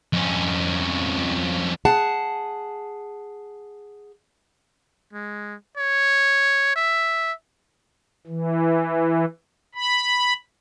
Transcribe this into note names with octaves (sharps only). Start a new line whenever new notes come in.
F2 C#4
G#4 F#5 A5
G#3
C#5
E5
E3
B5